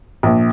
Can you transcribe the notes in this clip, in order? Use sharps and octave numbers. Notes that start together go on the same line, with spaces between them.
A#1